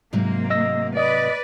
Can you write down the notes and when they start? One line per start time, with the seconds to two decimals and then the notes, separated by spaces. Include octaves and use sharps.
0.13 G#2 C3 F#3 A#3
0.50 D#5 E6 A#6
0.97 B4 D5 D#5 D#6